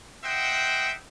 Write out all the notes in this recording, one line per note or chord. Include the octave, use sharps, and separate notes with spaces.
C5 D#5 E5 F#5 G5